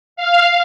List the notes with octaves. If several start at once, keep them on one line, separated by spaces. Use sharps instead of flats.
F5